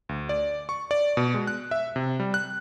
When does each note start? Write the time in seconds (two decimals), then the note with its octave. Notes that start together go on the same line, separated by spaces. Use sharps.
0.09 D2
0.29 D5
0.69 C#6
0.91 D5
1.17 B2
1.34 G#3
1.47 F#6
1.71 E5
1.96 C3
2.20 G3
2.34 F#6